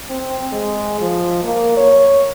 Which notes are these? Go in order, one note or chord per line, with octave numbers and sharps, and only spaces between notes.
C4
G#3
F3
A#3
C#5